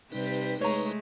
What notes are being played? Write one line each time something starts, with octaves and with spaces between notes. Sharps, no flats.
C3 G3 D#4 G4 B4
G#3 A3 G#4 C#5 A#5